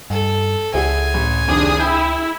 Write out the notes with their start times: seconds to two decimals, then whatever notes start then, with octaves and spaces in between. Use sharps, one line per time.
0.10 G2 A4
0.74 C#2 E4 G#4 F#5 G#5
1.14 A1
1.48 F1 D#3 D4 G#4 D6 D#6
1.80 E4 G5 G6